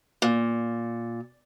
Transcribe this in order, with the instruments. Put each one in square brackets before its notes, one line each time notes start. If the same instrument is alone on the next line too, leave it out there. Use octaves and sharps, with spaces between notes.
[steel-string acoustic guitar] A#2